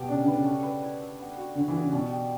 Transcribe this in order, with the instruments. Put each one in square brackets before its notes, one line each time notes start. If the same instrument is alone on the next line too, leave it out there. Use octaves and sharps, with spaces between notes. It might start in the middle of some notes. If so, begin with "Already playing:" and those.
Already playing: [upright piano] B2 [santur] B3 G4
[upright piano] C#3 [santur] D4
[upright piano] D3
[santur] B4
[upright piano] C#3
[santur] A3
B4
E4
E5
B3
F#4
[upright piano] D3 [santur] D4
[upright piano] E3
[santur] B3
[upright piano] C#3
[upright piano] B2 [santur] G3
[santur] G4